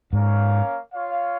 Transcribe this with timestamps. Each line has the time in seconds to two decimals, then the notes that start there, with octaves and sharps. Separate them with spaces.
0.13 G#2 A#3 C#4 A#4 C#5 F5
0.93 F4 C#5 F5